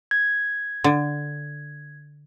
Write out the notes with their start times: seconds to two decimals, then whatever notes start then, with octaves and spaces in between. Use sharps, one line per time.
0.11 G#6
0.84 D3